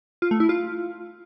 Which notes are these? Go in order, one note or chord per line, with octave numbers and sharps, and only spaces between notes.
F4
A3
E4
F4